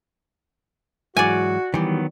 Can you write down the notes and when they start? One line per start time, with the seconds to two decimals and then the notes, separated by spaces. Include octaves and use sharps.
1.17 G#2 E3 F#3 F#4 D5 G#5
1.74 D#3 E3 F#3 G3 B3